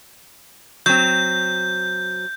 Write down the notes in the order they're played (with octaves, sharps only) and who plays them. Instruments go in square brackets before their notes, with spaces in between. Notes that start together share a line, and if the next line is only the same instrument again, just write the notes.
[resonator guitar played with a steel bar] F#3 C4 [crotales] G6